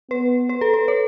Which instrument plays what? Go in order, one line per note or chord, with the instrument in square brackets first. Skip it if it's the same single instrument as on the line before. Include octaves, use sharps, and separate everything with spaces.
[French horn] B3 [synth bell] B4
[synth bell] B4
A4
B4
C#5